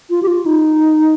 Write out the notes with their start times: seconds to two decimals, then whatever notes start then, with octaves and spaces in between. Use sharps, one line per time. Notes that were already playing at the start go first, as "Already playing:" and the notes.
0.10 F4
0.23 G4
0.27 F4
0.46 D#4